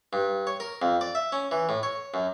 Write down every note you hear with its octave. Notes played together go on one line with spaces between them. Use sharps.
G2
C#5
A#4
F2
D5
E5
C#4
E3
A2
C#5
F#2